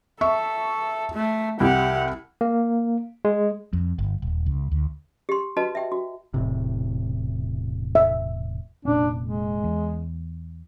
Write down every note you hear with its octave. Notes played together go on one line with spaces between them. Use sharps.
A4 E5 C#6
A3
C2 E4 G4 F#5
A#3
G#3
F2
G1
D#1
C#2
D2
G4 C6
F#4 B4 D#5 A5
E5 G5
F#4
E1 A2 C3
E5
F1 A#2 C#4 D4
G#3
E2